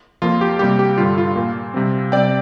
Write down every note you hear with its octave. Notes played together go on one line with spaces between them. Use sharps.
F2 F3 A#3 F4
G4
C3 G3 A#3 G4
G4
G2 D3 G3 F4
F4
A#2 A#3
C3 G3 C4
C3 G3 C4 D5 G5